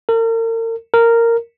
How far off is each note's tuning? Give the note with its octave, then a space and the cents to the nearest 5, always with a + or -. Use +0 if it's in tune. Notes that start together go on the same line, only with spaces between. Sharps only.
A#4 -40
A#4 -10